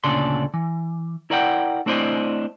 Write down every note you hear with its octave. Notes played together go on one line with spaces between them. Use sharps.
D2 A#2 C#3 D4 A4 C6
E3
E4 A#4 D5 D#5 F#5 G5
A3 C4 D4 E4 C5 D#5